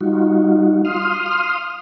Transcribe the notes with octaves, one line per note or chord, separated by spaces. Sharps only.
G3 D#4 F4 F#4
F5 C6 D#6 F6